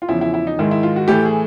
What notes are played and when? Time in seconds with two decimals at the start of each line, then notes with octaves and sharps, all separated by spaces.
0.02 F4
0.09 E2 C#3 F3 E4
0.21 E4
0.34 E4
0.47 D#4
0.59 G#2 D#3 G#3 E4
0.71 E4
0.83 F4
0.96 F#4
1.08 A2 E3 A3 G4
1.25 G#4